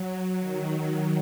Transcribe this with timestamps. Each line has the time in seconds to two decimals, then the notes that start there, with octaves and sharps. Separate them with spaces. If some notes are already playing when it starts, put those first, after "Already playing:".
Already playing: F#3
0.40 D#3